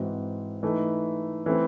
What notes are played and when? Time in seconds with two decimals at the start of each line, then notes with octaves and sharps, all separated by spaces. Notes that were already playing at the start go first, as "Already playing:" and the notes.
Already playing: G#2 E3 C4 F#4
0.63 E3 A3 D#4
1.46 E3 A3 C4